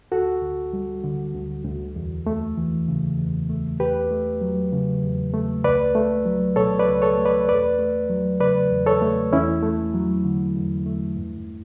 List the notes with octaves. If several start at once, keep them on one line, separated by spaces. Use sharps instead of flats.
D2 F#4 A4
D2
G3
D3
D2
D2
E2
A3
E3
C#3
E2
A3
E2 G4 B4
A3
F#3
C#3
E2
A3
C#2 B4 D5
A3
F#3
B2 A4 C#5
B4 D5
C#2
A4 C#5
A3
B4 D5
E2 B4 D5
A3
F#3
C#3 B4 D5
E2
A4 C#5
A3
E2 C#4 E4
A3
F#3
D3
E2
A3
G2